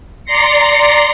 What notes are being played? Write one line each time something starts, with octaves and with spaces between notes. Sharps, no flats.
D5 A#5 C6 A#6 C7 C#7